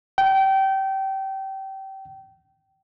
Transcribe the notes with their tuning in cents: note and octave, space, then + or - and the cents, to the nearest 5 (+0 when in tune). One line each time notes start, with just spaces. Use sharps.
G5 -25